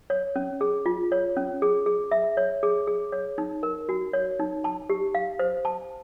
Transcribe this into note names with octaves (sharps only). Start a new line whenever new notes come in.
C#5
C#4
G#4
F4
C#5
C#4
G#4
G#4
E5
C#5
G#4
G#4
C#5
D#4
A#4
F#4
C#5
D#4
A5
G4
F5
C5
A5